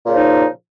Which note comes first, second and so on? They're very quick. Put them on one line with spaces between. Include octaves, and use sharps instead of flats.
A#2 C#3 F3 D#4